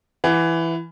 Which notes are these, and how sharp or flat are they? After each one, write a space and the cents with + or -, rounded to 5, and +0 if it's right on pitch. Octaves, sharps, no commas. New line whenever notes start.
E3 +10 F#5 +0